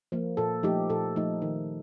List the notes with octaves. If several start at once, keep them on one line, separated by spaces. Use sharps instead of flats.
F3 A#3
A#2 A4
F3 A3 D#4 G4
A#2 A4
F3 A3 D#4
D#3